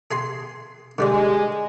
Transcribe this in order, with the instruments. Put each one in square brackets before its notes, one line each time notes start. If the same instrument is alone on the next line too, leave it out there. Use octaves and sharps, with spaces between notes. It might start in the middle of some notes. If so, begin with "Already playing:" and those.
[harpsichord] G#4 G#5 C6
[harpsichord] D3 G3 D5 [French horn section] G#3